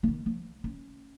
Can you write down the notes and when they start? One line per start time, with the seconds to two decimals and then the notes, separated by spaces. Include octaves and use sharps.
0.03 C#3
0.08 D#3
0.26 F3
0.64 C#4